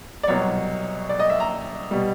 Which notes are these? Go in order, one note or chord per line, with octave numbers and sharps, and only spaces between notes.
D5
C2 B2 F#3 C#5
D5
D#5
E5
A#5
B2 G3